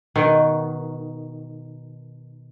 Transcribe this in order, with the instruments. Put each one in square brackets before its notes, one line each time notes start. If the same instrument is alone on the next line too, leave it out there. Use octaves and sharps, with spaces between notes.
[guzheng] B2 D#3